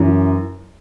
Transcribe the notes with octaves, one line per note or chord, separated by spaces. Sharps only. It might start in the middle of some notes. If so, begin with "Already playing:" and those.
Already playing: F#2 E3